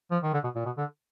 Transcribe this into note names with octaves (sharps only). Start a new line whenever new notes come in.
F3
D#3
D3
B2
A#2
B2
D3